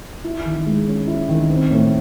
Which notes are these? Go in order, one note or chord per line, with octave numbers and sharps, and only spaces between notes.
E4
D#3
G#3
C#4
E4
D#3
C4
A2